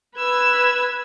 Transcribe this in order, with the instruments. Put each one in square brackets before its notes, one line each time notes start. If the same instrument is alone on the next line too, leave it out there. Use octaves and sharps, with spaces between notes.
[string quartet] B4 E6 G#6